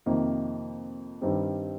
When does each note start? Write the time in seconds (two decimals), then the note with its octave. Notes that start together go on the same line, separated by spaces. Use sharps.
0.06 F2 C3 D#3 A#3
1.21 G2 D#3 G3 C4